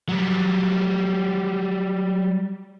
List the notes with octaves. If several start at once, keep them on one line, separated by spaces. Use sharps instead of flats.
F#3 G3